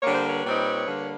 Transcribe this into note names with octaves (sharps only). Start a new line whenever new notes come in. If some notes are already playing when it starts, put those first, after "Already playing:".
D3 G3 A#3 C#5
C5
B4 C#5
A#2 G3 C4 D#4
D3 G3 A#3